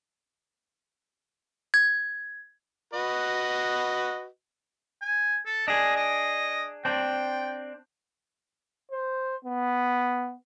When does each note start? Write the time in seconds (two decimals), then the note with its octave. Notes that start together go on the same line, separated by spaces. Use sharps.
1.74 G#6
2.93 F#4 B4 D#5
5.02 G#5
5.46 A4
5.68 D4 G#4 D#5
5.96 D#5
6.85 C4 D4 G5
8.91 C5
9.44 B3